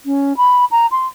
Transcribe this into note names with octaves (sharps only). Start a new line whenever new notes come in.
C#4
B5
A#5
C6